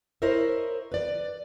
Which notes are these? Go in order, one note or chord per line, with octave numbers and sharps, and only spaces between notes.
E4 A#4 C5 C#5 D#5 E5
B4 D5